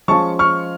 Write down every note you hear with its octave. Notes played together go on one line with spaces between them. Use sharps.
F3 G#3 C#4 F4 A5 C#6
C#6 F6